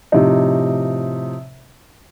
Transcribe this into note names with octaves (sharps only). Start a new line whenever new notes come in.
A2 C3 F3 D#4